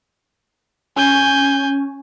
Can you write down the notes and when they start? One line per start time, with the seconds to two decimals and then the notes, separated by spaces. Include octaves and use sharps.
0.96 C#4 G#5 G6